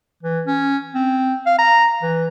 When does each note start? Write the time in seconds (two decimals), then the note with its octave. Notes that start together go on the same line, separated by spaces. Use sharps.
0.23 E3
0.47 C#4
0.95 C4
1.46 F5
1.59 A#5
2.03 E3